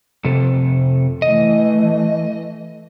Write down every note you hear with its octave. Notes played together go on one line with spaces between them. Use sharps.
F2 C3 A4
E3 A3 D#5